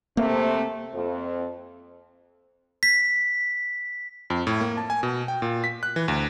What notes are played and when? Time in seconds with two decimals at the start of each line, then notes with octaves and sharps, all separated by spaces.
0.17 C3 A3 A#3 C4
0.93 F2
2.83 B6
4.30 F2
4.47 A2
4.61 A#3
4.77 A5
4.90 G#5
5.03 B2
5.28 G5
5.42 A#2
5.64 B6
5.83 F#6
5.96 E3
6.08 D2